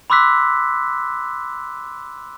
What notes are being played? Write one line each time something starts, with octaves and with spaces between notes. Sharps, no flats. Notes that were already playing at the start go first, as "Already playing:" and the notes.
B5 C6 D6 E6 F#6 B6